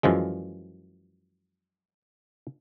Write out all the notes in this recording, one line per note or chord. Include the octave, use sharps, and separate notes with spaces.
F#2 E3 F3 G#3